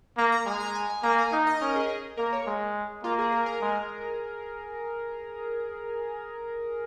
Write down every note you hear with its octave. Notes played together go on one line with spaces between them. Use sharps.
A#3 A#5
A#5
G#3 G#5
A#5
G#5
G#5
A#3 A#5
G#5
D#4 F5
D#5
C#4 A#4
G#4
G#4
A#3 A#4
C#5
G#3
A#3 F4
G#4
A#4
A#4
G#3